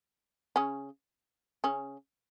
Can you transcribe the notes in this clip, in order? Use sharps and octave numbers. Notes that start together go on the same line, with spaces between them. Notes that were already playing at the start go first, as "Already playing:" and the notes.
C#3 C#4
C#3 C#4